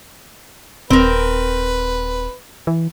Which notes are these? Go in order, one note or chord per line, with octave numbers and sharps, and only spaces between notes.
D#1 C4 A#4 B4
E3